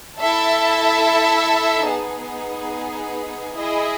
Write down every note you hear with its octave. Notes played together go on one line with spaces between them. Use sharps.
E4 A4 E5 A5
B3 D#4 G#4
E4 G#4 D#5